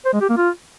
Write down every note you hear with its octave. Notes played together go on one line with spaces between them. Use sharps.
C5
G#3
G4
A#3
F4